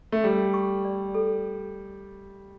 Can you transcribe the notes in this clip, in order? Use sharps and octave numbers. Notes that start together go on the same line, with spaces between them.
A3
G3 A4
C#6
D5
A4